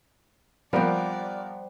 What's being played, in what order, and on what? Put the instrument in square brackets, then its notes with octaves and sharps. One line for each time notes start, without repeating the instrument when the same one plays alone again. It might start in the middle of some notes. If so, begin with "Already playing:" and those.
[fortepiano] F3 B3 A#4 [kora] G3 G4 [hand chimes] C5 F#5 [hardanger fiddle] D5